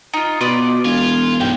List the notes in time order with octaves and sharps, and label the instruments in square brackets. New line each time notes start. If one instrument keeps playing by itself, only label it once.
[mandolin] D#4 F4
[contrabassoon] B2 [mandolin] F4 B4 D5
[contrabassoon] E1 [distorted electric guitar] F4 [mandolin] G#5
[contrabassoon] B1 [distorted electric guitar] G2 [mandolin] G5